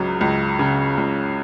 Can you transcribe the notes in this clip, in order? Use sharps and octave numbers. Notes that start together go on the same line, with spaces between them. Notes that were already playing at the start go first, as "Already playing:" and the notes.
Already playing: C#2 C#3 F#3 A#5
C#2
C#3
C#2